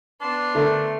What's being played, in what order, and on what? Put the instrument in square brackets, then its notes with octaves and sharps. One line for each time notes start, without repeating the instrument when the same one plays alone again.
[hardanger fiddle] B3 C6 [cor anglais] D4
[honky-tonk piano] D3 A#4 [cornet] A3